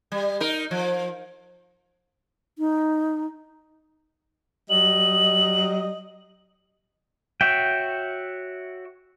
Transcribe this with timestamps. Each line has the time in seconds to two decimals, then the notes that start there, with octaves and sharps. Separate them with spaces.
0.12 G3
0.40 D#4 A#4
0.71 F3
2.59 D#4
4.70 F#3 G3 D#5 F#7
7.41 F#4 C#5 E5 G5